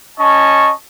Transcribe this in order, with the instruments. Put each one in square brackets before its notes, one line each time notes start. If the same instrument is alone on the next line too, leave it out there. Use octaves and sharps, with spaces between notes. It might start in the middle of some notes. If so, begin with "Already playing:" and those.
[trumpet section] C#4 D#5 A5 C#6